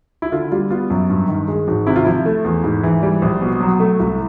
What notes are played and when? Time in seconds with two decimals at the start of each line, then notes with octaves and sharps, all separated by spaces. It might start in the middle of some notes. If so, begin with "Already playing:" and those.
0.22 E4
0.32 D3 F4
0.52 G3 F4
0.71 B3 F4
0.90 F#2
1.09 G2
1.29 D#3
1.48 G#3
1.68 G#1
1.87 C3 E4
1.96 F4
2.05 F3 E4
2.26 A3
2.44 E2
2.64 G#2
2.83 E3
3.03 G3
3.22 A#1
3.41 B2
3.61 F#3
3.80 A3
4.00 C2